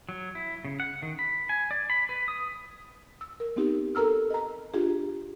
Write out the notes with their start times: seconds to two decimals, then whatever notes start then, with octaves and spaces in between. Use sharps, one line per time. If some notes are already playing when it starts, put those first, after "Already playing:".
0.09 F#3
0.35 E4
0.65 C#3
0.80 F#5
1.02 D#3
1.19 B5
1.49 G#5
1.71 D5
1.90 B5
2.09 B4
2.28 D#6
3.21 E6
3.40 A#4
3.56 B3 C4 D#4 G4
3.95 A4 A#4 A#5 E6 F6
4.30 D#5 A#5
4.74 D4 F4 G4 G#4